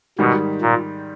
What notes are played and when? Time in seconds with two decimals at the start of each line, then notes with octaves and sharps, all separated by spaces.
0.19 G#2 B2 D#3 G3
0.61 A#2